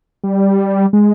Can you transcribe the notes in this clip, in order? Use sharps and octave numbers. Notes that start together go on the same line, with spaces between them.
G3
G#3